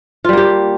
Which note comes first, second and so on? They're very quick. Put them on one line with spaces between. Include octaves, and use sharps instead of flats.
F4 G3 A#3 G4